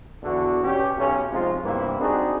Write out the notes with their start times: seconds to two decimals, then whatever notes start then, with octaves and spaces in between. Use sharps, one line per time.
0.23 E2 D3 F#4
0.64 B2 C#4 G4
0.97 B1 C#4
1.31 C3 F3 G#3 C4 D#4 F4
1.63 G2 C3 E3 A#3 B3 E4
2.00 C4 D4 D#4 F#4 G#4